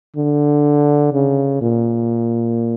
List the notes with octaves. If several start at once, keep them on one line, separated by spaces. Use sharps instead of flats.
D3
C#3
A#2